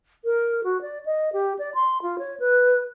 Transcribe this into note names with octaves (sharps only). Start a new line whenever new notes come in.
A#4
F#4
D5
D#5
G4
D5
C6
F4
C#5
B4